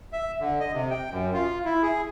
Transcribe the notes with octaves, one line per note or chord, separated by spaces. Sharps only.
E5
D3
D#5
C3
G5
F#2
F4
E4
G#4